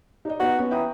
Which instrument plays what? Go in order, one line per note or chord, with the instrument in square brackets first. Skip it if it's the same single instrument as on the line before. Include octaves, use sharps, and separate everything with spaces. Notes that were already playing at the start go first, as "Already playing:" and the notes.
[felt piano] D#4 D5 D#5
[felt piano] B3 D#4 [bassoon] F#4
[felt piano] B3 C#4
[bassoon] E3 [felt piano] G5 A#5 D#6